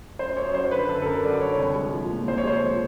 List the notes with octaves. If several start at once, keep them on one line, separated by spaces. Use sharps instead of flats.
F#2 C5
F#2 C#5
F#3 C5
D3 B4
F#2 A4
A4
F#2 A#4
F#3 D5
D3 C#5
C2
G#3
F3
A#2
C2 C5
C#5
G#3 C5
F3